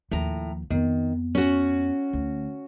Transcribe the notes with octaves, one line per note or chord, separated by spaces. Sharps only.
D#2 A2 F3 A#5
F2 D#3 B3
C#4 F#4
D2